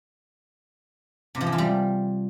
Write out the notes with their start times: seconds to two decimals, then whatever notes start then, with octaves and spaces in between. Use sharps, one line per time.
1.35 C3
1.41 F3
1.47 E3
1.52 F4
1.58 G3